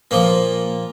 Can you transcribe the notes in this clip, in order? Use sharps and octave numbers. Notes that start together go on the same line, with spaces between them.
A#2 F3 A#3